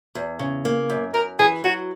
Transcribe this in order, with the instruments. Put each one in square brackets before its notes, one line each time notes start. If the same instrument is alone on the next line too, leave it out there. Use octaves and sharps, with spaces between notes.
[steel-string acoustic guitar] E2
C#3
A#3
F#2
[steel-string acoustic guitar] F#2 [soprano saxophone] A#4
[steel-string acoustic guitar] E3 [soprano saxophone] G#4
[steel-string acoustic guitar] F#3 [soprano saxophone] F#4